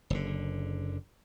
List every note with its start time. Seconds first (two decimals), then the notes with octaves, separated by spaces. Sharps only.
0.10 F#1 D3